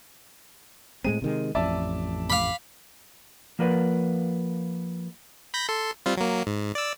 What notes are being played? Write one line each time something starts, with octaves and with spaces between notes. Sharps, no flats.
A2 G#3 C4 D#7
C3 D#3 G#3
A1 F2 D5 E5 A5
F5 B5 D6
F3 A#3 A#4 B4 D5 F#5
B5 G6 A#6
A4 C6
G3 C4 F4
F#3 A#3
G#2
D5 E6